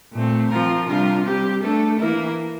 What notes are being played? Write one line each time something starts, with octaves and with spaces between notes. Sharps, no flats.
A#2 A3 C4
F3 C4 F4 A#4
C3 G3 D4 F4 A#4
G3 C4 G4
A3 D4 A4
E3 A#3 E4 A#4